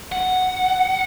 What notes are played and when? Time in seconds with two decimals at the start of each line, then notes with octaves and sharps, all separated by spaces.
0.12 F#5